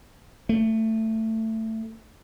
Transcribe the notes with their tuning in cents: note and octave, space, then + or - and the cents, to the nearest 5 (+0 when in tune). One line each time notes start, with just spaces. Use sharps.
A3 +15